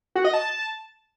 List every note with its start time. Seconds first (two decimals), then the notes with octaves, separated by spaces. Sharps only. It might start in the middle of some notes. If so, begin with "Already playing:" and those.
0.15 F#4
0.25 D#5
0.34 A5